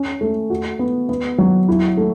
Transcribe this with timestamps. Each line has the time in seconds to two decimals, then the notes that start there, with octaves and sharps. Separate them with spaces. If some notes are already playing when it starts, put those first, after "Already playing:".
Already playing: C#4
0.21 A3
0.50 F#4
0.79 B3
1.09 B3
1.38 F#3
1.68 E4
1.97 A3